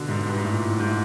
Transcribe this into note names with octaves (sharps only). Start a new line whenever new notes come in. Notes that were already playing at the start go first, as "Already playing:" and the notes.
Already playing: B2 D3
G#2
G2
G#2
A2
A#2
A2
G#2